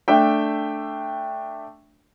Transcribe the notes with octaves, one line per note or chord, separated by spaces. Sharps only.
A3 D4 E5 G5